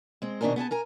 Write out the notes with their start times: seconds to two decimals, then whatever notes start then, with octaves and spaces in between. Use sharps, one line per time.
0.22 G#3 C4
0.41 B2 D#3 C4 D4 G#4 A#4
0.56 B3 G#4 C#5 A5
0.71 A#4 G#5 A#5